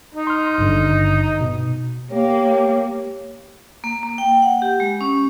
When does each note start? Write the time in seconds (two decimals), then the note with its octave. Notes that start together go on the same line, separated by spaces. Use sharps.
0.14 D#4
0.27 C6 F6
0.58 G#1 G2 D3
1.41 B2
2.11 A#3 G4 C#5
3.84 A#3
4.03 A#3
4.18 G5
4.42 F#5
4.62 G4
4.80 G#3
5.01 C#4